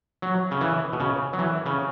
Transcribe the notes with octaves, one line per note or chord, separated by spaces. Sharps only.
F#3
C#3
E3
B2
C#3
F#3
E3
C#3